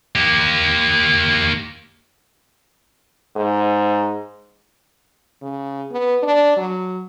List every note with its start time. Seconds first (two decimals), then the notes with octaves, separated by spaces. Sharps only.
0.15 A#3 G4
3.36 G#2
5.42 C#3
5.91 B3
6.23 D4
6.56 F#3